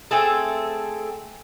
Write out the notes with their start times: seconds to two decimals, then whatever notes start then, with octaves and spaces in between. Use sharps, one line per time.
0.11 A3 C4 G#4 A4